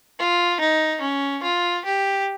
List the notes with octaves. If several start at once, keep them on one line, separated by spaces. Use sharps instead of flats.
F4
D#4
C#4
F4
G4